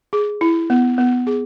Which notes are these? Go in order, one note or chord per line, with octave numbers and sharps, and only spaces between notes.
G#4
E4
B3
B3
G#4